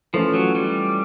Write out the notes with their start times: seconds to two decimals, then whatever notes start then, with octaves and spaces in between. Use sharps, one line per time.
0.13 E3 F3 A3 C#4 F4
0.34 F#3
0.55 G3